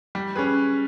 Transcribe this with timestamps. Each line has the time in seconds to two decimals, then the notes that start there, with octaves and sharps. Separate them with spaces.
0.15 G3
0.36 C#4 G#4 B4